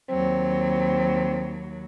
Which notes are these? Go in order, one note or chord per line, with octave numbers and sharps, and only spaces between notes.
D#2 F#3 C4